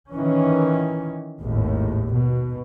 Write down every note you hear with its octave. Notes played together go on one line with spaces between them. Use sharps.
D#3 E3 C#4
G#1 D#2 A2
B2